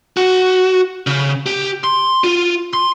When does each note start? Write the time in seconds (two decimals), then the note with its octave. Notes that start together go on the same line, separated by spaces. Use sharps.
0.17 F#4
1.07 C#3
1.46 G4
1.84 C6
2.24 F4
2.73 C6